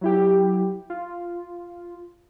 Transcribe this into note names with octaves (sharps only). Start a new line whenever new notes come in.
F#3 E4 G4
F4